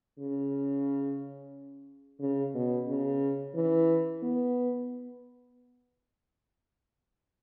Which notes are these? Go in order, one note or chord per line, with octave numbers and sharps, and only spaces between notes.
C#3
C#3
B2
C#3
E3
B3